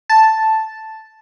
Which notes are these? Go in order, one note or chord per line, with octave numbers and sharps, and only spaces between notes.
A5